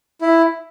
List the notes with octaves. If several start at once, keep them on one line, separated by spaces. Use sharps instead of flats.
E4